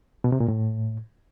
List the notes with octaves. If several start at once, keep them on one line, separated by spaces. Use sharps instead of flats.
B2
C3
A#2
A2